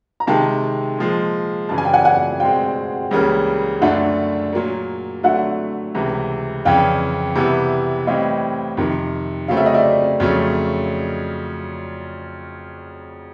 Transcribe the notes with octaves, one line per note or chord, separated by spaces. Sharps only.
A#5
C3 D#3 G#3 G5 A5
A#2 F3 G#3
F#2 C#3 E3 A5
G#5
G5
F#5 G#5
F#5 G#5
B2 G#3 C4 F5 G5
C#2 C#3 E3 G3 A#3
F#2 D3 F#3 A3 D4 E5 F#5
A#2 F#3 A#3
D3 F#3 A3 E5 F#5
C#2 C3 E3
F2 C#3 E3 F5 G5
C3 E3 G3 B3 E4
A2 E3 G3 C4 D#5 F5
F2 C3 D#3
C#3 F#3 A3 C4 F5
E5
D#5
D5 E5
F2 C#3 F#3 A3 C#4